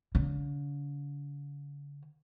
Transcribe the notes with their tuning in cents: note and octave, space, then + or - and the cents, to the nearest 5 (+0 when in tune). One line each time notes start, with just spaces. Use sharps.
D3 -45